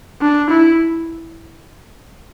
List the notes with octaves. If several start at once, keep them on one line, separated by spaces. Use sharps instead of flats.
D4
E4